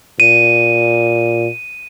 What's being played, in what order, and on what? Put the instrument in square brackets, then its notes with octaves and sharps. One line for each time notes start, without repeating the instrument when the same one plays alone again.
[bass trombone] A#2 [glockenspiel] D#7